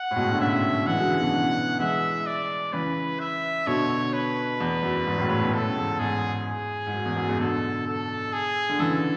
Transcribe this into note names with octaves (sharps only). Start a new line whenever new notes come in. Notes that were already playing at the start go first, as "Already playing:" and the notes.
Already playing: F#5
A2
G#2 B2
D3
A2 C#3 E5
D3
C#3 E3 F#5
G#3
D3 F#3
C#3 E3
B2 D3
C#3 E3
E3 G#3 E5
D5
C#3 E3 B4
E5
B2 D3 C#5
B4
E2
F#2
E2 G#2
F#2 A2
A2 C#3
B2
A2 C#3 A4
E2 G#2
E2 G#2 G#4
G#4
G#2
F#2
E2
F#2
E2 G#2
B2 D3 A4
A4
G#4
D3
C#3 E3 A4